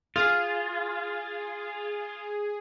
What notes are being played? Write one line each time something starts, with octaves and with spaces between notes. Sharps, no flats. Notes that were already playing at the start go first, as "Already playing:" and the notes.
F4 G#4